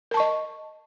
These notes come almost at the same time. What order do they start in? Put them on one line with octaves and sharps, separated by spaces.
A#4 A5 C#6 D#5